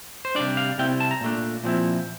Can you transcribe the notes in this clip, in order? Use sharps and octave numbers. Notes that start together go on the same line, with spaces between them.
C5
C3 G3 D4 D5
F5
C3 G3 C4 E4 G5
A5
A#5
A#2 A3 D4
A#2 F3 C4 E4